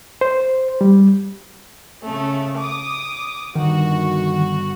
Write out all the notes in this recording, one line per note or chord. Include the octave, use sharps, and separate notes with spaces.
C5
G3
C#3 A3
D6 D#6
G1 D#3 F#4